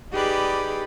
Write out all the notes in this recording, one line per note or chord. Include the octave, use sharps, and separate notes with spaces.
D#4 G4 G#4 B4 D5 B5